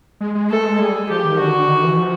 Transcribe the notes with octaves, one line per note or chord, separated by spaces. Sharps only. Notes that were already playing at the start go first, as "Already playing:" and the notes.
G#3
G#3
A3 A4
G#3
G3 G#4
F3 G4
D#3
D3 F#4
D#3
E3
F3